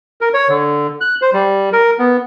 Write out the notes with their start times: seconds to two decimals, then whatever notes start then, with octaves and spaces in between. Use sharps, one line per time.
0.21 A#4
0.34 C#5
0.49 D3
1.01 F#6
1.22 C5
1.33 G3
1.73 A#4
1.99 B3